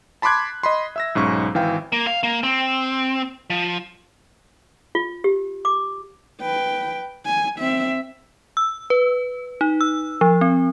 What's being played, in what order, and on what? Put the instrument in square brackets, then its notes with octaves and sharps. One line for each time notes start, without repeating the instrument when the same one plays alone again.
[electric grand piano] A5 B5 C6 D6 F#6 G#6
D#5 B5 C6
E5 E6 A#6
B1 G#2 C#4 C#6
G#1 E3 F5 G5
[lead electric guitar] A#3
F5
A#3
C4
F3
[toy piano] F4
G4
D6
[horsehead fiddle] B4 G5
G#5
C4 E5
[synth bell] E6
B4
D#4
E6
F3
C4